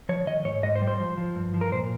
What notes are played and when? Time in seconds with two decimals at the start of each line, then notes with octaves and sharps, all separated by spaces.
0.09 F3 C#5
0.27 D#3 D#5
0.45 G#2 C#5
0.63 G#2 D#5
0.75 C5
0.82 G3
0.88 C5
0.99 F3
1.17 F3
1.36 G2
1.54 F3
1.61 A#4
1.72 A#2 C5